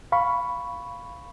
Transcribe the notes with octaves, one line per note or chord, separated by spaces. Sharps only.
F5 B5 C#6